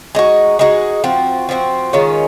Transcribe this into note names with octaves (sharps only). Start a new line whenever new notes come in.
G#3 D#4 F#4
G#3 D#4 F#4
F3 C4 F#4
F3 C4 F#4
D#3 G#3 C#4 F4